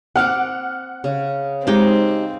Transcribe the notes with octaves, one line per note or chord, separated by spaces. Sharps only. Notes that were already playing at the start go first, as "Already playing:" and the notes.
C4 F#5 D6 F6
C#3
G#3 C4 D#4 G4